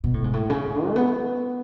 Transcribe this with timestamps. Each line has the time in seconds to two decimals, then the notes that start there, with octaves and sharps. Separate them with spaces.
0.04 B2
0.14 A2
0.24 G#2
0.33 A2
0.50 C#3
0.89 A3
0.96 B3